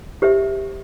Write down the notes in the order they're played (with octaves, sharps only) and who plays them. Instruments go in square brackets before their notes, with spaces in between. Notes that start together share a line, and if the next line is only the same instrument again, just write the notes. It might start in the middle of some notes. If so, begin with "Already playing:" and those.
[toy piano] G4 C5 E5